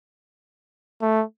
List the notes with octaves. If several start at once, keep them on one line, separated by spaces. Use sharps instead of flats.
A3